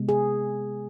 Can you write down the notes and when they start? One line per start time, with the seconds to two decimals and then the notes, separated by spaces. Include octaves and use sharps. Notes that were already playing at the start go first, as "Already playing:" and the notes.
Already playing: C3 G#3 B3
0.09 G#4